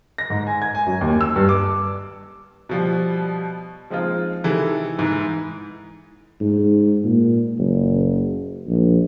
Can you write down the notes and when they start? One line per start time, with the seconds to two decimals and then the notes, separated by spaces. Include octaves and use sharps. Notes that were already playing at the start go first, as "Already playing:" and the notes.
0.18 A#6
0.30 G#2
0.47 G#5
0.62 G#6
0.75 G#5
0.86 F#2
1.01 D#2
1.21 E6
1.36 G2
1.49 D6
2.69 B2 F3 G3
3.90 F3 G#3 C4 D#4 F4
4.44 C3 D#3 E3 E4 G#4 A4
4.98 G#2 E3
6.41 G#2
7.04 A#2
7.58 F#1
8.67 A#1